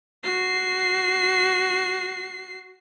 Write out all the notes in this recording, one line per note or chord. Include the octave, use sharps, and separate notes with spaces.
F#4 C7